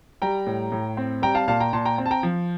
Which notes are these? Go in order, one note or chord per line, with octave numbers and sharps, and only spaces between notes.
G3 G5 A#5
A2
A2
C4
G3 G5 A#5
F5 A5
A#2 F5 A5
G5 A#5
A#2 A5 C6
G5 A#5
C4
A5
G5 A#5
F3